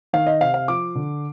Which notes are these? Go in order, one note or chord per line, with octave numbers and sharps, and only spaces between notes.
D#3 F5
D#5
C3 F5
F5
F3 D6
D3